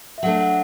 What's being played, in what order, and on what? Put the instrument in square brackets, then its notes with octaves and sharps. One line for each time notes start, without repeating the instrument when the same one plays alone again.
[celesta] E5
[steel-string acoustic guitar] F#3 A3 D4 [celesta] F#5
[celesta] F#5